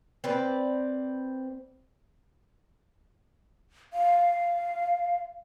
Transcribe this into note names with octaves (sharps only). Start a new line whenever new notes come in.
C4 B4 D5
F5